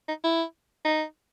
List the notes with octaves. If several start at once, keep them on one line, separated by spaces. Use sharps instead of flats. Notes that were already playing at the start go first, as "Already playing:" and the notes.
D#4
E4
D#4